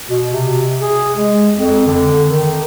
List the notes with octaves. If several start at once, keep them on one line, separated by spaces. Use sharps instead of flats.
B2
C3
G#4
G#3
F2
D3
D#3